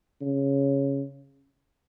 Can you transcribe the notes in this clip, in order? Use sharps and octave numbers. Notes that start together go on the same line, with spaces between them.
C#3